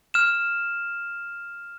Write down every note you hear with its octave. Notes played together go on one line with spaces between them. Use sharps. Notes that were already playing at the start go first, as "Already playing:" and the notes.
F6 E7